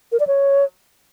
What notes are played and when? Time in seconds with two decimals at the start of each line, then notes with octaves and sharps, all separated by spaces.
0.12 A#4
0.20 D5
0.27 C#5